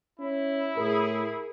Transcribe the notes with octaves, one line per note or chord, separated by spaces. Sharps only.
C#4 E4
A2 G#4 A#4